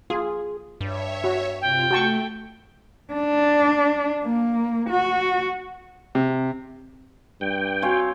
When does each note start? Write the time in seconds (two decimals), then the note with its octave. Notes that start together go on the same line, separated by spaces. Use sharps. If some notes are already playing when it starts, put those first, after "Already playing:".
0.10 F4 G#4
0.81 G2 C#5 E5
1.24 F#4
1.61 C3 F4 G5
1.91 A3 F#4 A5 C#6
3.14 D4
4.24 A#3
4.89 F#4
6.15 C3
7.41 G2 G5
7.82 C4 F#4 C#5 F5 G#5